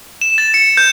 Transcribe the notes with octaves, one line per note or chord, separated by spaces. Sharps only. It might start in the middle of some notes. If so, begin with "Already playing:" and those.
E7
A6
C#7
G6